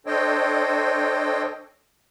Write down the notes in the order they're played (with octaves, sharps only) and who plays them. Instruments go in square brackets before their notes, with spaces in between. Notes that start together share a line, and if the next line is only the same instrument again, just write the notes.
[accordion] D4 A4 C5 C#5 D#5 G5